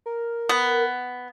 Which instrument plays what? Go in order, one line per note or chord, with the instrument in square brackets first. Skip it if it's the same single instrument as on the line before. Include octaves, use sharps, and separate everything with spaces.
[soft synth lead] A#4
[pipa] B3